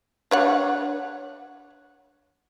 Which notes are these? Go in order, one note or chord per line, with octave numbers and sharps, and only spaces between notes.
D4 C#5 F#5